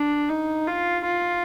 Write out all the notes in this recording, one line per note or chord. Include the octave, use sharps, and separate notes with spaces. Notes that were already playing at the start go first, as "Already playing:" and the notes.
Already playing: D4
D#4
F4
F4